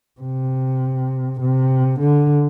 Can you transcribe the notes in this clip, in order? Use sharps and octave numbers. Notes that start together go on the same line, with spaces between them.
C3
C3
D3